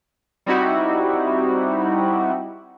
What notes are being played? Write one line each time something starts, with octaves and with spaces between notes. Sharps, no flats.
G3 C4 D#4 E4 F#4 G4